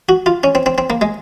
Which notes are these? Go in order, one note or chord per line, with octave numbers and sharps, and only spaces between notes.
F#4
F4
C#4
C4
C4
C4
A#3
G#3